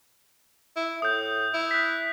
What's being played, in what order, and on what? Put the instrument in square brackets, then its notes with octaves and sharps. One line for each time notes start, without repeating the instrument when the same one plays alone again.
[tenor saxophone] E4
[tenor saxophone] A2 [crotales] D#6 G6
[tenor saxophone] E4
[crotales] F#6 B6